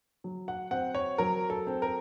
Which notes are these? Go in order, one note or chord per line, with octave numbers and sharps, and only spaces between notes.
F#3
F#5
C4 F#5
C#5
F#3 A#4
A4
C4
A#4